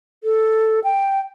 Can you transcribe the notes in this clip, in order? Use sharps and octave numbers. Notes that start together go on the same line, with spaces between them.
A4
G5